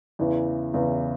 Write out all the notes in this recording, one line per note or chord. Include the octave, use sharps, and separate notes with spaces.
E2 C#3 E3
E2 C#3 E3